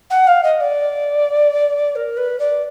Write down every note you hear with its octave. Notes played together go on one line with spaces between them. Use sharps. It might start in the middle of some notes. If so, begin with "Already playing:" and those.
F#5
F5
D#5
D5
A#4
B4
D5